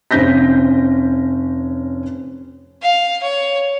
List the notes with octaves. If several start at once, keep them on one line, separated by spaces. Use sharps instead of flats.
F1 C4 C#4 G6 A#6 B6
F5
C#5